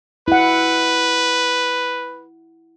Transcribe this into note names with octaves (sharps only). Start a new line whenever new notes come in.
E4 B4 F#5